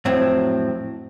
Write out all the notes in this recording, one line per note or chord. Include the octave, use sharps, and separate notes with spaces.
F2 A2 F#3 C4